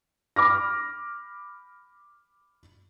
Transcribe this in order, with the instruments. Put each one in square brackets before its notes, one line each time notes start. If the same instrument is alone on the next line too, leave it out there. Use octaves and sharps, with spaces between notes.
[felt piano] B5 D6 F6 A#6